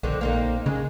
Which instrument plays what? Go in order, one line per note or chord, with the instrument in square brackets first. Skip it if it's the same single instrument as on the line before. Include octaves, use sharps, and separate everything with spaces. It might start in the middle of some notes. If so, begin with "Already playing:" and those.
[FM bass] A#1 [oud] D3 D#3 C4
[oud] A#3 C4 D#4
[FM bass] C#3 [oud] G#3